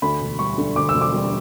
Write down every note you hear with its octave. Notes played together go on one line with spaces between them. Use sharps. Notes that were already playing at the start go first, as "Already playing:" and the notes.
D2 B5
E1
G3 C#6
D3
D2 D6
E6
E1
D6
G3